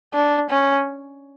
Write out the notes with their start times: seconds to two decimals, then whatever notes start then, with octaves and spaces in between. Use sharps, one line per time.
0.14 D4
0.49 C#4